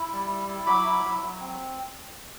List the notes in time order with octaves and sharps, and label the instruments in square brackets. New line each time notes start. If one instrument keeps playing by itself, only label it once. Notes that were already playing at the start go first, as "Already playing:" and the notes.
Already playing: [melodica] E4
G3
E4
E4
F#3 B5 D6
E4
F#3
F#3
C4